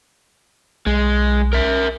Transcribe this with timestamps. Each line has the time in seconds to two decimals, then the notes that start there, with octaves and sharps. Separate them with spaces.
0.87 B1 G#3
1.53 A#4 E5